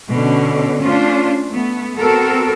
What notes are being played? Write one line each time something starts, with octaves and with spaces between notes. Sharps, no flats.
B2 D3 C#4
A3 C#4 D4 F4 C5
A3 B3
B3 C4 F#4 A4 A#4